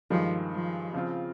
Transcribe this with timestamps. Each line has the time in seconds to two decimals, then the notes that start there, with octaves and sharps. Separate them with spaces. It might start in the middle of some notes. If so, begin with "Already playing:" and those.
0.10 G2 D#3 F3 G#3
0.52 F3
0.93 C#3 F3 C4 F4